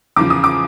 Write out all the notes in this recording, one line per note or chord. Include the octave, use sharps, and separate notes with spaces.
E2 C#3 F3 D6
D#6
D6